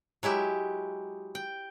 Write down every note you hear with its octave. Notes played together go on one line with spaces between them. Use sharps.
F#3 G#3 E4 G4
G5